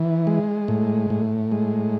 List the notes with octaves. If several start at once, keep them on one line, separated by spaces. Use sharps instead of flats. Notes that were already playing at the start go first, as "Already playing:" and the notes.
Already playing: E3
G#3
A2
A2
G#3